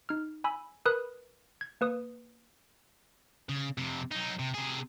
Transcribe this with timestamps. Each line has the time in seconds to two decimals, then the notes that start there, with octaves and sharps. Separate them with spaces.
0.09 D#4 F6
0.44 G#5 B5 E6
0.86 A#4 B4 B5 D#6 F#6
1.61 G#6
1.81 A#3 B4 D#6
3.49 C#3
3.78 F2 C3
4.11 F#3 D#4
4.39 C3
4.54 C3 G#4